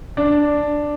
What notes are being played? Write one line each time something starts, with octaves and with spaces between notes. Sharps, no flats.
D4